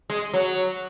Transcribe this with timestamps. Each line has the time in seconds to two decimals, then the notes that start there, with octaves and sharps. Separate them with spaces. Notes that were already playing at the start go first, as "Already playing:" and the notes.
0.10 G#3
0.33 F#3